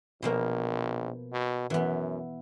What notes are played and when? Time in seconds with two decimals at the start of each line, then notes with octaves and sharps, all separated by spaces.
0.22 A#1 B2 F3 A#3
1.33 B2
1.70 F#2 E3 B3